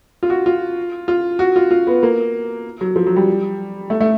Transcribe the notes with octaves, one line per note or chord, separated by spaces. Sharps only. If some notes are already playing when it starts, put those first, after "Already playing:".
F4
F#4
F4
F4
F#4
F4
F4
B3
A#3
F#3
F3
F#3
G3
A3
A3